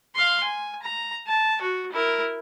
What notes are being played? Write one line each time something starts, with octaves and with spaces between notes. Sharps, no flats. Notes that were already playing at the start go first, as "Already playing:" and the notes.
F5 C6
G#5
A#5
A5
F#4
E4 A#4